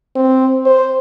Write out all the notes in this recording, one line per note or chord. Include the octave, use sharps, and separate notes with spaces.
C4
C5